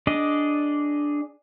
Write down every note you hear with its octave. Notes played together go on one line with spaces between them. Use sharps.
D4 G#4 D5 D#5